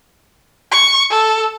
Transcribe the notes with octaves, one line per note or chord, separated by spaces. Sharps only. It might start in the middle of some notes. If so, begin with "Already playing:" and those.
C#6
A4